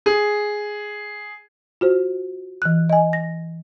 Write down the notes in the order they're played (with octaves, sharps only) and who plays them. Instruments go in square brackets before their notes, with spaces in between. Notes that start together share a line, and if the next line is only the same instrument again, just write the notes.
[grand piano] G#4
[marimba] F4 F#4 C5
E3 F#6
D#5 G#5
A#6